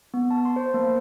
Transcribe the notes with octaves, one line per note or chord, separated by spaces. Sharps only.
B3
A5
C6
C5
A#3